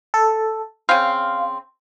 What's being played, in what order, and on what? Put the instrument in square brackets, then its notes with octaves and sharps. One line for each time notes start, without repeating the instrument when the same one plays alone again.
[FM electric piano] A4
[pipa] C#3 C4 [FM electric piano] F5